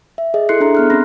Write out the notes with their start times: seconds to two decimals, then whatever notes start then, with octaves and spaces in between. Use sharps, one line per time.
0.18 E5
0.34 G#4 D#5 E5
0.49 E4 A4 C6 F#6 C7 C#7
0.60 D4 G#4 E5 A#5 F#6
0.75 B3 F6 F#6
0.90 C4 C#4 B5 C6 F#6 A#6